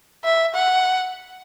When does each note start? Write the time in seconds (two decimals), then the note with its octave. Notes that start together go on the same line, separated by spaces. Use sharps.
0.24 E5
0.54 F#5